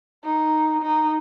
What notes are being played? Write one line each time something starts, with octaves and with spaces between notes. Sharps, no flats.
D#4
D#4